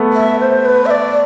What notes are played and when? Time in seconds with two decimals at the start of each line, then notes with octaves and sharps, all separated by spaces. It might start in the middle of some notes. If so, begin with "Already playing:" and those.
Already playing: A3 B3
0.13 E5
0.40 C5
0.65 B4
0.85 E5
0.90 D5